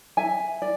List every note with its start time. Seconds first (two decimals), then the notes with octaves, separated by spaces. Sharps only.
0.17 E5 G#5
0.62 D5